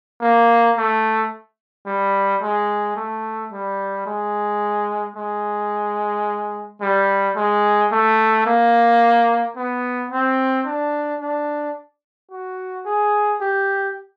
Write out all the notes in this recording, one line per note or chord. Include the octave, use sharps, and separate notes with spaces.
A#3
A3
G3
G#3
A3
G3
G#3
G#3
G3
G#3
A3
A#3
B3
C4
D4
D4
F#4
G#4
G4